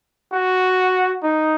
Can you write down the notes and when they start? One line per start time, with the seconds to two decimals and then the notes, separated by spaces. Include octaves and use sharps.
0.33 F#4
1.23 D#4